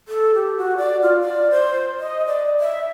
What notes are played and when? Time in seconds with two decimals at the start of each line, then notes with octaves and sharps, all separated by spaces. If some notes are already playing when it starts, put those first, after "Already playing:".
0.08 A4
0.35 G4
0.57 F#4
0.77 D5
1.02 F4
1.20 D5
1.51 C5
1.99 D#5
2.26 D5
2.60 E5